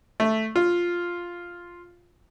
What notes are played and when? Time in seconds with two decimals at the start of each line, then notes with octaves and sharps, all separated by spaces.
0.20 A3
0.56 F4